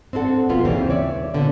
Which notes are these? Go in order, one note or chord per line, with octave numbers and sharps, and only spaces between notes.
C4 D4 E4 A4 F#5
B2 F3 A#3 B3 F4
D#2 C#3 E3 G3 C4
C#5 D5 E5
A#2 D3 B3